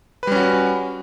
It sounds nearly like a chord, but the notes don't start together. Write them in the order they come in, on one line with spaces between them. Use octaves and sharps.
B4 G3 C#4 F#4